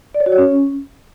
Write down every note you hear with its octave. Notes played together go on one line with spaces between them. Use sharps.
D5
C#5
F#4
C#5
C#4